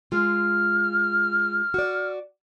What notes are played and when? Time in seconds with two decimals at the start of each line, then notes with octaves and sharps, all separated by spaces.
0.12 G#3 F4 F6
1.74 F#4 D5